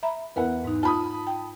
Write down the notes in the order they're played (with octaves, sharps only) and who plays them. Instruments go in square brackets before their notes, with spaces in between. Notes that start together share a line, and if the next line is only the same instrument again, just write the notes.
[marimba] E5 A#5 B5
[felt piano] E2 E4 F#5 [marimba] A#4 B4
[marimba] G#2 D#4
[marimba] F4 [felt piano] A5 B5 D#6
[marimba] G5